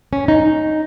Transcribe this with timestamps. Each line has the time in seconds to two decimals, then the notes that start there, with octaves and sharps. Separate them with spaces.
0.13 C#4
0.28 D#4